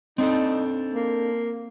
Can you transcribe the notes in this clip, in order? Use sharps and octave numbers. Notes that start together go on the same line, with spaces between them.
C4 D4 D#4 A4
A#3